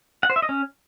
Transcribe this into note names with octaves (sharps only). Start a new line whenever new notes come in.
F#5
C5
E5
D#5
C#4